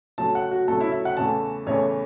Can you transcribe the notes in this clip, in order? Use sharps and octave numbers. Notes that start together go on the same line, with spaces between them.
C#3 F#3 A3 A5
F#5
F#4
C#3 F#3 A3 A4
E4
E5
F#5
E2 C#3 E3 A3 A5
E2 C#3 E3 A3 C#5